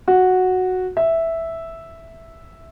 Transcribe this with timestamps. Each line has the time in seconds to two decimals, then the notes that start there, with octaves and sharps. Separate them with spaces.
0.08 F#4
0.97 E5